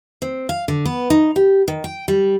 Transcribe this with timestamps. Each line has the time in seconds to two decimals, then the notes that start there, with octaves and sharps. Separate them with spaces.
0.22 C4
0.49 F5
0.68 D3
0.86 B3
1.10 D#4
1.36 G4
1.68 D#3
1.84 G5
2.08 G3